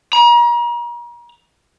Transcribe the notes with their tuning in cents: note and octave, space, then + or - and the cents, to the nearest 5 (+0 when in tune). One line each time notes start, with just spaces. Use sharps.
A#5 +40